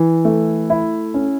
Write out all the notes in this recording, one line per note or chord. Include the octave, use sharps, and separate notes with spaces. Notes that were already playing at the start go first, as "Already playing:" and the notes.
Already playing: E3
A3
E4
C#4